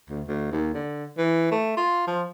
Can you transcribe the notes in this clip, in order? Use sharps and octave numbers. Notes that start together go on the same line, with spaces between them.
D2
D2
D#2
D3
E3
A3
F4
F3